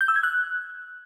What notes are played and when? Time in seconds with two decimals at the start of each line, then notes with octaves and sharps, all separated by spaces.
0.01 G6
0.08 E6
0.16 G#6
0.23 F#6